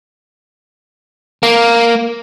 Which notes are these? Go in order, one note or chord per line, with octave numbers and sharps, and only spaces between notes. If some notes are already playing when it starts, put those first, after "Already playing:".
A#3